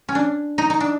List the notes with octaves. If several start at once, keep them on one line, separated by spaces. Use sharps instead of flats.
C#4
D4
D#4
D#4
D4